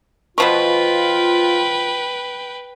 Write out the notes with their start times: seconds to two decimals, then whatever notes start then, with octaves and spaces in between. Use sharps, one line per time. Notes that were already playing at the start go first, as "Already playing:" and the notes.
0.38 B2 F3 F4 B4 G5 C#6